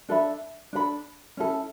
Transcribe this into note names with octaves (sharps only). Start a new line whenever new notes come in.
D4 A4 E5 B5
D4 A4 E5 B5
C#4 E4 A4